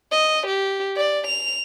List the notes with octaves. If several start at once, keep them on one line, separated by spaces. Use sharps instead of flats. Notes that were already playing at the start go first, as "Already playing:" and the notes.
D#5
G4
D5
F7